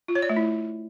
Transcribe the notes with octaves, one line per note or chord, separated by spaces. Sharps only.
F4
C#5
D5
A3
E4